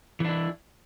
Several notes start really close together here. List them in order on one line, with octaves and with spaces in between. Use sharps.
E3 D4 E4